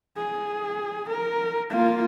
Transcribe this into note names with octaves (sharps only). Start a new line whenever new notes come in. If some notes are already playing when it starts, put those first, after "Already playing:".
G#4
A#4
A#3 F4